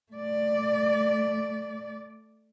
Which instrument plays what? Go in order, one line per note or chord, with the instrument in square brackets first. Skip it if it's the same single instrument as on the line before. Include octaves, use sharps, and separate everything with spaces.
[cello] A3 D5